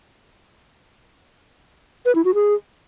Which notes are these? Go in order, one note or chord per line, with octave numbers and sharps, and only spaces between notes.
B4
E4
F#4
G#4